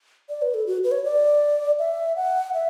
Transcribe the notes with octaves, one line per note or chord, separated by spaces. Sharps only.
D5
B4
A4
F#4
B4
C#5
D5
E5
F#5
E5